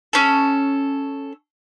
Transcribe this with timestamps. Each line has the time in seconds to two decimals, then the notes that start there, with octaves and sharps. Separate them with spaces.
0.13 C#4 A4